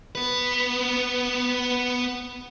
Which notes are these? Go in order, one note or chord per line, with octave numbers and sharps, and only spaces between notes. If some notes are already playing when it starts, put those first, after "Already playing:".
B3 B4